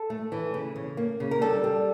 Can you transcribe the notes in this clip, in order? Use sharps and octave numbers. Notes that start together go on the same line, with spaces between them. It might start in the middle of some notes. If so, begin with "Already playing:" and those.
Already playing: A4
A3
E3
C#3
C#3
A#3
C#3
A#4
G3 A4
G3